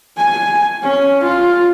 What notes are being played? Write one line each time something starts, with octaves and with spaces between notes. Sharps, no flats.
G#5
C#4
F4